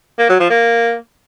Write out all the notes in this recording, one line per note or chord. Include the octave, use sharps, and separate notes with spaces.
A#3
F#3
F3
A#3